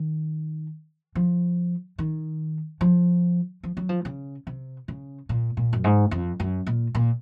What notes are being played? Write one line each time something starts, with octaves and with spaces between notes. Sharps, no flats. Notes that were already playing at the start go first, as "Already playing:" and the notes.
Already playing: D#3
F3
D#3
F3
F3
F#3
F3
C#3
C3
C#3
A#2
A#2
F#2
G#2
F2
F#2
A#2
A#2